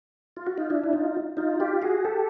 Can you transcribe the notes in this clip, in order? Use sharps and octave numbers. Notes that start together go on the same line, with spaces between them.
F4
F#4
D#4 F4
D4 E4
E4
D#4 F4
D#4 F4
F4 G4
F#4 G#4
G4 A4